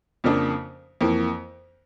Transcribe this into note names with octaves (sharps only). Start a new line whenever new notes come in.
F2 C#3 F3 A#3 D4
F2 E3 A#3